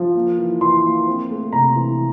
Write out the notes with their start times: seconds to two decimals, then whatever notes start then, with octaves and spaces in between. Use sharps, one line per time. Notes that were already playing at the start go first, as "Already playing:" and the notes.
Already playing: F3
0.15 A#3
0.38 E3
0.61 E3 C6
0.84 A#3
1.07 C4
1.31 A3
1.53 C3 A#5
1.76 E3